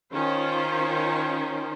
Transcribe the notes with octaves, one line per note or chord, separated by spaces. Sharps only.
D#3 C#4 F4 C5